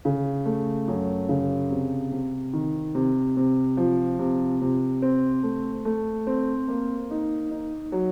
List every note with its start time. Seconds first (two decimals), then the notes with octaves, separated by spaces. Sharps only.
0.05 C#3
0.46 A3
0.88 F#2
1.29 C#3
1.70 C3
2.11 C3
2.53 D#3
2.95 C3
3.37 C3
3.77 F3
4.19 C3
4.61 C3
5.02 C4
5.43 A3
5.85 A3
6.27 C4
6.68 A#3
7.10 D#4
7.51 D#4
7.92 F#3